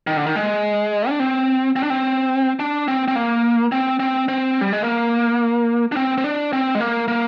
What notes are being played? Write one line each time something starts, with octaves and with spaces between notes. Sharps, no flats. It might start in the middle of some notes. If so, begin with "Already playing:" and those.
D#3
D3
D#3
G#3
D4
C4
C4
D4
C4
D4
C4
C4
A#3
C4
C4
C4
G3
G#3
A#3
D4
C4
C4
D4
C4
G#3
A#3
A#3